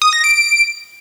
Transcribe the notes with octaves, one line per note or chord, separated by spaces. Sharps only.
D#6
A#6
D7